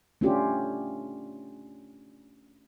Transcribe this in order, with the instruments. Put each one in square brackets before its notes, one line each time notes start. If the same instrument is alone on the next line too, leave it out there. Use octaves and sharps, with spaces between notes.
[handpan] A3 C#4 D4 F4 G4